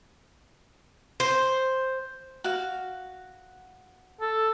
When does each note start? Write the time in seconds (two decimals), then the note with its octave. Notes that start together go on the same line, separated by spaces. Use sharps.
1.20 C5
2.44 F#4 F5
4.21 A4